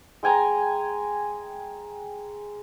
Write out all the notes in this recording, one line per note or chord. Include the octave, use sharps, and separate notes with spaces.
G#3 G5 G#5 A#5